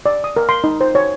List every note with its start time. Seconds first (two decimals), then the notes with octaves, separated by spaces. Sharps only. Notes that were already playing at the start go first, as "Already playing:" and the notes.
0.06 D5
0.24 D#6
0.36 A#4
0.49 C6
0.64 D#4
0.81 C5
0.95 C#5